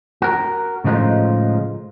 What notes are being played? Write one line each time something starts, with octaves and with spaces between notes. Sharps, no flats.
F#4 A#4
A2 C#3 F3 G#3 D#4 F4